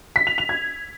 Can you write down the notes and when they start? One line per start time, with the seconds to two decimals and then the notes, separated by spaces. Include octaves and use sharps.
0.16 B6
0.27 F7
0.38 F7
0.49 G#6